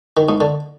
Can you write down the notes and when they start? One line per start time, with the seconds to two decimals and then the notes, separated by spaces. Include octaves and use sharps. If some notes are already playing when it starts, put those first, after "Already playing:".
0.17 D#3
0.29 G#2
0.41 D3